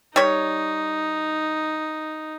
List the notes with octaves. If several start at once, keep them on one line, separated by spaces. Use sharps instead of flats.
G3 D#4 C#5